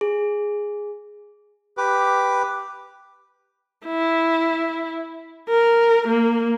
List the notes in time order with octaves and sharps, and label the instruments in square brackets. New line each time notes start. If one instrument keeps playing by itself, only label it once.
[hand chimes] G#4
[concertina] G4 B4 D6
[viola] E4
A#4
A#3